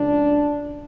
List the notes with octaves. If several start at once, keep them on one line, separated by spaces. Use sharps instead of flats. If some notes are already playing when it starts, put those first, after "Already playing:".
Already playing: C#2 C#3 F3 D4